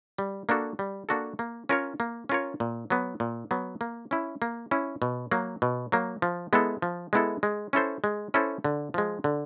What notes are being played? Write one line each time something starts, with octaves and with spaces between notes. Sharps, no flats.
G3
A#3 D4 F#4 A4
G3
A#3 D4 F#4 A4
A#3
C#4 F4 A#4 C#5
A#3
C#4 F4 A#4 C#5
A#2
F#3 B3
A#2
F#3 B3
A#3
C#4 E4
A#3
C#4 E4
B2
F#3 A#3
B2
F#3 A#3
F3
G#3 B3 E4 A4
F3
G#3 B3 E4 A4
G#3
C#4 E4 A4 C5
G#3
C#4 E4 A4 C5
D3
F3 G#3
D3